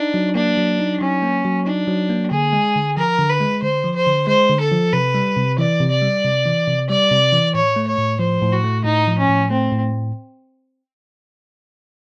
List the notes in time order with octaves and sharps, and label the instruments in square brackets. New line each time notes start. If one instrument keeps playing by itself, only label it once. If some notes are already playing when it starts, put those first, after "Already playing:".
Already playing: [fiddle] D4 [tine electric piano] D#4
[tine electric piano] F#3
[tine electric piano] A#3 [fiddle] D4
[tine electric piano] F#3
D#4
[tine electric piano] F#3 [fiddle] C#4
[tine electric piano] A#3
F#3
[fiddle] D4 [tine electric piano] D#4
[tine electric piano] F#3
A#3
[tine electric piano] D3 [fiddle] G#4
[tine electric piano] G#3
D3
[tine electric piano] F3 [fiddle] A#4
[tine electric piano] D3
[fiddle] B4
[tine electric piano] G#3
[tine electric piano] D3 [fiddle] C5
[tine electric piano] F3
[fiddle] C5
[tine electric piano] D3
[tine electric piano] G#3 [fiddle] C5
[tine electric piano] D3
[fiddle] A4
[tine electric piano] F3
[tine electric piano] C3 [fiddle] B4
[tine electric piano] G3
C3
[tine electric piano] E3 [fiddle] D5
[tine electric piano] C3
[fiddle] D5
[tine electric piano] G3
C3
E3
C3
[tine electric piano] G3 [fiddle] D5
[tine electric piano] C3
E3
[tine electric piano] A2 [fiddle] C#5
[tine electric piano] A3
[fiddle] C#5
[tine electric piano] A2
[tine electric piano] F3 [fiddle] C5
[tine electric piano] A2
[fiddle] F#4
[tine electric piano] A3
[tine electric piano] A2 [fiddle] D#4
[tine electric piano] F3
[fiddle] C#4
[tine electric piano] A2
[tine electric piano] A3 [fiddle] C4
[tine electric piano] A2